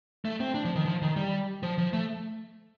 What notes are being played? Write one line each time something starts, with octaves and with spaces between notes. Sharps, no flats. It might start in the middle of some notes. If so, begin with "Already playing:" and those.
A3
C4
D4
F3
D#3
F3
D#3
G3
F3
F3
A3